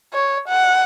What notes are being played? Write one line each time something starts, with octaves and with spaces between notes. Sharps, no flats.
C#5
F#5